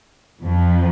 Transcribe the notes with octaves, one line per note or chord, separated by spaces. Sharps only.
F2 F3